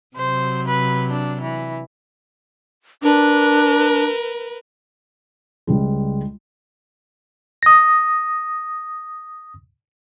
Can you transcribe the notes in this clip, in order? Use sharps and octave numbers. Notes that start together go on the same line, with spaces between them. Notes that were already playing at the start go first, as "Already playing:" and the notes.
C3 F#3 C5
B4
D4
E3
D4 A#4 B4
C#2 G3 G#3
D#6 A#6